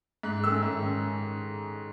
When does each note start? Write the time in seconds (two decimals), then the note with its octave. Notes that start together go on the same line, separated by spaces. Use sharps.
0.23 G#2 F#6
0.43 D#3 A3 C#4 E6
0.63 G#2
0.83 D#3 C#4